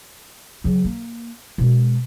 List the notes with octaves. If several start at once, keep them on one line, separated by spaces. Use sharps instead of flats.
C#3 F#3
A#3
B2 G#3